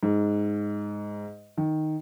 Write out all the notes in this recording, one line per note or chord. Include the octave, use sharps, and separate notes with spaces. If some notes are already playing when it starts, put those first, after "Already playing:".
G#2
D#3